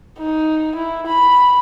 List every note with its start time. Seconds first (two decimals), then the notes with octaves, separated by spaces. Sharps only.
0.18 D#4
0.76 E4
1.07 B5